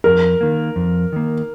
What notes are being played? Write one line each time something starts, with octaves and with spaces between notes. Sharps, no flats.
F2 A#4
D#3 A#3
F2
D#3 A#3